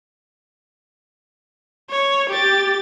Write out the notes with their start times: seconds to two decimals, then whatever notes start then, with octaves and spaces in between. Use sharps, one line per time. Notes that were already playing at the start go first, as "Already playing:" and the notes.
1.90 C#5
2.30 G4 A6